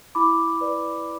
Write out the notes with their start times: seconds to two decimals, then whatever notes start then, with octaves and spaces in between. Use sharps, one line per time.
0.15 E4 B5 D6
0.61 B4 D5